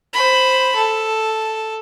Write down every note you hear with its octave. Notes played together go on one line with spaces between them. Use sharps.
C5 B5
A4